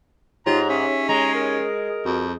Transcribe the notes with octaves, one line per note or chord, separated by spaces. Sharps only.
G#2 D#4 F4 G4 C#5 A#5
C#4 E5
G#3 A#5
A#4
F2 F#4